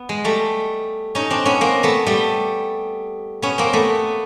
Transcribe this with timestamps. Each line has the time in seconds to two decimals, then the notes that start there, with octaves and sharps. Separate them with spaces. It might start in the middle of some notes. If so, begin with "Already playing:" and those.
Already playing: B3
0.09 G#3
0.24 G3 A3
1.15 C#4 D#4
1.30 C4 D4
1.45 B3 C#4
1.61 A#3 C4
1.83 A3 B3
2.06 G3 A3
3.42 B3 C#4
3.58 A#3 C4
3.73 A3 B3